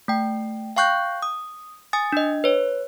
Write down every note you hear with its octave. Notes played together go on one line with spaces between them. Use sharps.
A3 G5
F5 G5 C#6 F#6 G6
D#6
G#5 D#6 A6
D4 D#5
B4 C#5